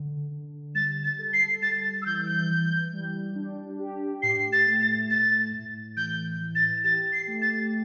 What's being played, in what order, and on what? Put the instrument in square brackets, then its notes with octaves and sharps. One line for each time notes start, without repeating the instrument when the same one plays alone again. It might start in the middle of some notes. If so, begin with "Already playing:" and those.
Already playing: [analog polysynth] D3
D3
[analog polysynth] G3 [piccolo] A6
[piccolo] A6
[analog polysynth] A4
[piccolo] C7
[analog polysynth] G3 [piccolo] A6
[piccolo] A6
E6
[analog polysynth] E3 [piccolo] G6
[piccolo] G6
[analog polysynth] E3
G3
D4
G4
[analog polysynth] A2 [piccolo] C7
[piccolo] A6
[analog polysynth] A3
[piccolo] A6
[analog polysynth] A2 [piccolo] A6
[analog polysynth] A2
[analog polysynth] E3 [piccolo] G6
[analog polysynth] E3
[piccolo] A6
[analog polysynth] G4 [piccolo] A6
[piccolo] C7
[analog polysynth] A3
[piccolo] A6